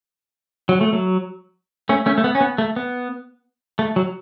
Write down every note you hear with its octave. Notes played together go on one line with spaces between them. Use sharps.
F#3
A3
F#3
A3 C#4
A3 C#4
A3
B3
C#4
B3
A3
B3
A3
F#3